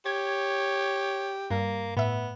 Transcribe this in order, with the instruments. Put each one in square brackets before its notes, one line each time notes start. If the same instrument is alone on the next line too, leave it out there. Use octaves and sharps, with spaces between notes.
[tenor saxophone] G4 [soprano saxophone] C#5 [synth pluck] G#6
[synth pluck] G2 [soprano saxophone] A#3
[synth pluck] A2 E5 [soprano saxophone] B3